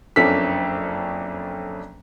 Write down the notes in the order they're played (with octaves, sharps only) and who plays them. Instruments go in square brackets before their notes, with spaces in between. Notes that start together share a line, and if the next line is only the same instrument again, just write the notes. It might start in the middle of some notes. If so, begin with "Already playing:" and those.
[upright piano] F#1 F2 C#4 D4 A4 B6